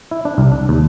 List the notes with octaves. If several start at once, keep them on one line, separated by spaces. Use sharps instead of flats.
E4
D4
C2
D4
D#2